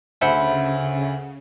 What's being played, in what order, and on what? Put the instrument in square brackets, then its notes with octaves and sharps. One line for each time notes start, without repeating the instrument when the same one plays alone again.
[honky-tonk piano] D2 [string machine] C#3 [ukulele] C5 F#5 B5 [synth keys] E5